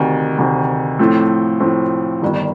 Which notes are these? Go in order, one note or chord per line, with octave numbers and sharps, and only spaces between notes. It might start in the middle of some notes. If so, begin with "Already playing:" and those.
Already playing: D2 C3 D#3
D2 C3 D#3
A2 F3 A3 C4
A2 F3 A3 C4
G1 G2 D#3